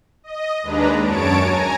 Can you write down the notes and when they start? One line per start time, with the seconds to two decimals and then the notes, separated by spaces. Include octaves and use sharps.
0.24 D#5
0.63 D#2 G#3 D4 B4 A#5
1.02 F#2 C#5 A5 D7
1.38 G#5 A#5